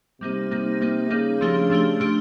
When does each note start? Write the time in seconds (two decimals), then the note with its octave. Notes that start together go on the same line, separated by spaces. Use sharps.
0.21 C3 G3 A#3 D#4
0.51 G3 A#3 D#4
0.81 G3 A#3 D#4
1.10 C#3 G3 A#3 D#4
1.41 F3 A3 D4 G4
1.70 F3 A3 D4 G4
2.00 F3 A3 D4 G4